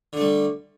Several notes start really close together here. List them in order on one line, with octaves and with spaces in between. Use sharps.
D3 A3 G3